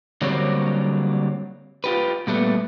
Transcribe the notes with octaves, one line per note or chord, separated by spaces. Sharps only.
D3 F#3 G3 A#3 C4 C#5
F4 G4 B4
A#2 G3 A3 B3